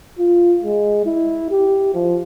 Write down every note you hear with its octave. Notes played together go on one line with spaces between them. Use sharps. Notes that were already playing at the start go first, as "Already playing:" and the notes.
F4
G#3
E4
G4
F3